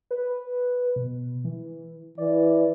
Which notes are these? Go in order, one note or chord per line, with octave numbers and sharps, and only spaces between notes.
B4
B2
E3
E3 D5